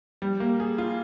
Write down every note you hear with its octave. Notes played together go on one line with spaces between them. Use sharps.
G3
A#3
G#4
F4